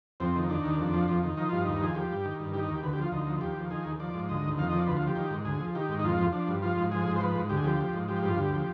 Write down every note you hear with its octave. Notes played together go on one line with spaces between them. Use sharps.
F2 C4
D#3
D#3 D4
D#2
F2
F3
F2
D#3
F3 D#4
G2 F4
D#4
D#2
F3 G#4
F3 G4
G2
D#3
G2
D#3 G4
D#4
D#2
G4
D2 B4
G4
F3 F4
D2 D#4
F3
D#2 G4
F3
D#3 G#4
D#2
F3 D5
G#2
D2 D#5
D#3
F2 F5
F3 D#5
D5
D2 B4
F4
F3
G4
D#3
G#2
D2 G#4
F3
D#3 G4
G#2
D#4
F2 F4
F3
F3 D4
G2
F3 F4
G#2
F3 G#4
G#2
C5
F3 B4
G#2
D2 G4
G#4
F3 G4
F3
G#2
F3 G4
G2 F4
D2 G4
F3